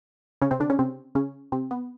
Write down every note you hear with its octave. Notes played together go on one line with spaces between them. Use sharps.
C#3 C#4
C3 C4
D3 D4
C#3 C#4
C3 C4
C#3 C#4
C3 C4
B3